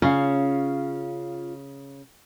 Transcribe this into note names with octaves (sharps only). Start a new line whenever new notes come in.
C#3 C#4 F4 F5